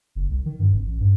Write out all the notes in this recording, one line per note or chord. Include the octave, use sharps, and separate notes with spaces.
F#1
C2
D#3
G2
G#1
A1
G2